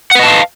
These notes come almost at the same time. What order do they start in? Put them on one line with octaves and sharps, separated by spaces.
F#5 B4 D#5 A5 F5